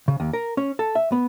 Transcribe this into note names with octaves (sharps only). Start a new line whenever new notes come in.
C#3
D#2
A#4
C#4
A4
E5
B3